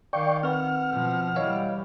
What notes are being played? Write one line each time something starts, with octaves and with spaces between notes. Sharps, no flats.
D#3 D5 F5 G5 C#6
C4 B4 F#5 F6
B2 F3
E3 G3 C#5 D#5 F5